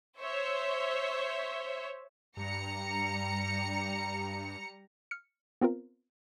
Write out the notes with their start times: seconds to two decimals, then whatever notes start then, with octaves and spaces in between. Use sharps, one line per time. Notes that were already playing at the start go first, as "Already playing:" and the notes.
0.20 C5 C#5 E5
2.37 G2 G3 A#5 C#7
5.11 F6 C#7
5.61 B3 C4 F4 A#4